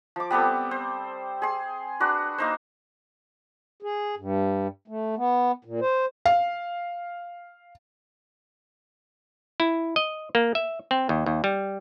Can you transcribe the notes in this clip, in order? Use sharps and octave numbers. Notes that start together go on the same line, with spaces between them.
F3 D6
G3 B3 C4 A4
C5
G#4 C6
D4 F#4 B4
A#3 D#4 C5
G#4
G2
A3
B3
A#2
C5
F5
E4
D#5
A#3
E5
C4
D#2
D#2
G3